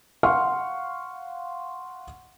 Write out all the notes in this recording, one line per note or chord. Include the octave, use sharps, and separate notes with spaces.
F5 F#5 C6 C#6 F6